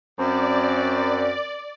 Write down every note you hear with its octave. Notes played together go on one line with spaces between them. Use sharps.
F#2 C4 D5